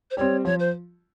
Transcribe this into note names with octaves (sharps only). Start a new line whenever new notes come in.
C5
G3 C4 C#5
F3 C#5
C5